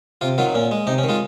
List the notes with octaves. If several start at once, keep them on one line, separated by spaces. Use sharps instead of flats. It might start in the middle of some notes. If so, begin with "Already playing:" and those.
C3 F4
D#3 F#3 F4
A#2 C#4
G#3
C3 D#4
C#4
D#3
G#3 F4